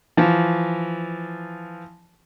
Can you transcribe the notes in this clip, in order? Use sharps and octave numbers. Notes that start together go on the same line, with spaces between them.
E3 F3